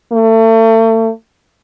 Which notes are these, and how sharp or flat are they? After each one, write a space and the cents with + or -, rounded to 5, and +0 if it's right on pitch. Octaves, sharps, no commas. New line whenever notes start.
A3 +35